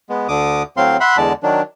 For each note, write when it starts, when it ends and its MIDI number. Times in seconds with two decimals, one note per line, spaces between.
0.10 0.27 56
0.10 0.27 59
0.28 0.63 38
0.28 0.63 50
0.28 0.63 86
0.28 0.63 87
0.77 0.97 45
0.77 0.97 54
0.77 0.97 60
0.77 0.97 77
0.77 0.97 84
1.00 1.17 76
1.00 1.17 78
1.00 1.17 83
1.00 1.17 84
1.17 1.33 40
1.17 1.33 50
1.17 1.33 56
1.17 1.33 74
1.17 1.33 81
1.43 1.62 51
1.43 1.62 54
1.43 1.62 62